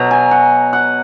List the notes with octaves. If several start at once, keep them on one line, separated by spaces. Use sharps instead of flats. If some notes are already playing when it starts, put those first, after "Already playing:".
Already playing: B2 F#3 A#5
G#5
F#5
F#5